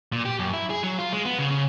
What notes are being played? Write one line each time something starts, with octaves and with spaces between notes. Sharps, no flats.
A#2
G4
F#2
E4
G#4
F#3
F4
G#3
B3
C#3
C#3